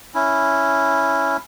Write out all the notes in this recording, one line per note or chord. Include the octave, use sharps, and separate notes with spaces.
C#4 E4